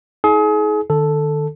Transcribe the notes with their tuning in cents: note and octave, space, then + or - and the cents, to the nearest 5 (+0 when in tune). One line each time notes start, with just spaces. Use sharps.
D#4 +45 G#4 +35
D#3 -45 A4 +0